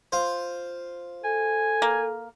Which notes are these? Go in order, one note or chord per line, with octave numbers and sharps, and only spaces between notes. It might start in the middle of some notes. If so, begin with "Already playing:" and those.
F4 C5
A4 G#5
A#3